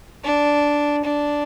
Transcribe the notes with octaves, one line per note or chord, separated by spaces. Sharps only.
D4
D4